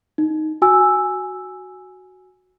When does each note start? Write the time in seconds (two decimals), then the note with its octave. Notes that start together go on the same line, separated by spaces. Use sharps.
0.18 D#4
0.62 F#4 G#5 E6